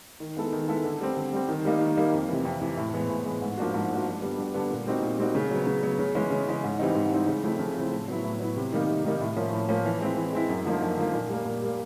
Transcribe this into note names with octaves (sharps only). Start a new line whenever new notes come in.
D#3
G#3 B3 E4 A4
D#3
G#3 B3 E4 A4
D3
G3 C4
D3
G3 C4
D#3
G3 A#3 D#4
D#3
G3 A#3 D#4
F2
C3 E3
F2
C3 E3
A2
E3 G#3 B3
A2
E3 G#3 B3
G#2
F3 A#3 D4 F#4
G#2
F3 A#3 D4 F#4
G2
D3 G3 B3 D4
G2
D3 G3 B3 D4
A#2
G3 C4 D#4 F#4
A#2
G3 C4 D#4 F#4
C#3
F#3 B3
C#3
F#3 B3
C#3
E3 G#3 C#4
C#3
E3 G#3 C#4
G#2
E3 G3 C4 D#4
G#2
E3 G3 C4 D#4
C#3
F3 A3 C4 E4
C#3
F3 A3 C4 E4
A2
F#3 B3 E4
A2
F#3 B3 E4
C3
D#3 G3 A#3 D#4
C3
D#3 G3 A#3 D#4
A2
F3 A#3 C#4
A2
F3 A#3 C#4
E3
G#3 C4 E4
E3
G#3 C4 E4
F#2
D3 F3 A#3 D#4
F#2
D3 F3 A#3 D#4
A#2
G3 A#3
A#2
G3 A#3